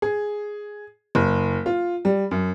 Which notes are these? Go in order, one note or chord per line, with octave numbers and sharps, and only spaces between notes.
G#4
F#1
F4
G3
F#2